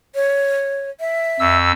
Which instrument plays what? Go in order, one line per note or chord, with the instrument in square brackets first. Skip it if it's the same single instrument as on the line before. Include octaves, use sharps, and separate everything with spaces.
[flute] C#5
E5
[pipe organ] F2 E6